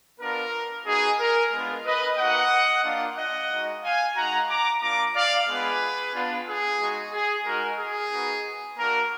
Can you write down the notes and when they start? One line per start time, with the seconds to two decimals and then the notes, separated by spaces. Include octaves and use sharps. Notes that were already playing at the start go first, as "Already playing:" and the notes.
0.20 B3 D4 F4 A#4
0.86 B3 D#4 F#4 G#4
1.20 A#4
1.52 G#3 B3 D4 F4
1.85 B4 D#5
2.17 A#3 D#4 F#4 D#5 F#5
2.84 A#3 D4 F4
3.17 D#5 F#5
3.50 G#3 D#4 F#4
3.83 F5 G#5
4.15 G#3 D#4 F#4 F#5 A#5
4.49 A#5 D6
4.82 A#3 D4 F4 A#5 D6
5.15 D5 F5
5.48 G#3 B3 D4 F4 G#4 B4
6.14 B3 D4 F4
6.46 G#4
6.80 G#3 D#4 F#4
7.13 G#4
7.46 G#3 D#4 F#4 A#4
7.78 G#4
8.11 B3 D#4 F#4
8.77 A#3 D4 F#4 A#4